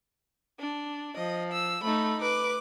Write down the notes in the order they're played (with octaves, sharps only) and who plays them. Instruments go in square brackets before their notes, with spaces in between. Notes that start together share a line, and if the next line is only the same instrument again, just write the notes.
[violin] D4
[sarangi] F3 [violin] D#5
[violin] E6
[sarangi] A3 [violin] D#4 B5
[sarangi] B4 [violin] D6